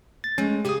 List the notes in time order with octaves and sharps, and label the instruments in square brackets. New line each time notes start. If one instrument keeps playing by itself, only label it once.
[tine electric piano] A6
[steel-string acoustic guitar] G#3 A3 [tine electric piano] C#4
[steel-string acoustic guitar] C#3 G#4 F5 [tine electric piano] G4 D#6